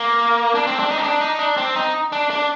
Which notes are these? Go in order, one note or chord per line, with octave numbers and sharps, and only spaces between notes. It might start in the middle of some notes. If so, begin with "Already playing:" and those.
Already playing: A#3
D4
C4
D4
D#4
C4
D4
D#4
D4
C4
D#4
D4
D4